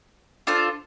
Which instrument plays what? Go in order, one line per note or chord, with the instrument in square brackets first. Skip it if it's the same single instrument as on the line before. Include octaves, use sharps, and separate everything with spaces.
[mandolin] D4 F4 A4 C5